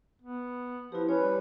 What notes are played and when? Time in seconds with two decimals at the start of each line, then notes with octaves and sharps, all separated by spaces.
0.22 B3
0.92 F3 E4 G4 B4
1.09 C#4 B4 C#5
1.23 G3